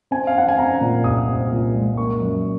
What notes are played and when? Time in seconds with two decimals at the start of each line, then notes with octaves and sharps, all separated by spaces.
0.11 C4 G#5
0.27 F5
0.35 C4 F#5
0.49 G#5
0.58 C4 A#5
0.81 A#2
1.04 C2 D#6
1.28 C4
1.51 A#2
1.75 G#3
1.97 A#3 C#6
2.21 F#2